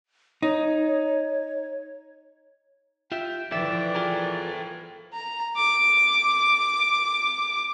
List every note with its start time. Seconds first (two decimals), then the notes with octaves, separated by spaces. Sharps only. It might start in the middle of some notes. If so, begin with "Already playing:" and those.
0.43 D#4 C#5
3.12 F4 G4 E5 G5
3.52 E3 F3 A4 D5 E5 G5
3.95 F4 G#4 A#4
5.14 A#5
5.57 D6